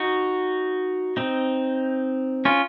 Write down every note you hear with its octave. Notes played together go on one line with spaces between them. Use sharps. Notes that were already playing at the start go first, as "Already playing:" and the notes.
Already playing: D#4 F#4
C4 D#4
C#4 F4